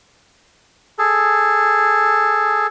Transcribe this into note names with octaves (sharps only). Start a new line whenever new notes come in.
G#4 A4